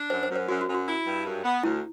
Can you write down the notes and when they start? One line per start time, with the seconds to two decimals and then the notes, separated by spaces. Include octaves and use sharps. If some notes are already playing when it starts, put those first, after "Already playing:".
Already playing: D4
0.10 F#2 C5
0.23 C5
0.30 F#2
0.36 C5
0.48 F#2 F#4
0.61 F#4
0.67 F#2
0.74 F#4
0.86 E4
1.05 G2
1.26 F#2
1.44 B3
1.63 D2 E4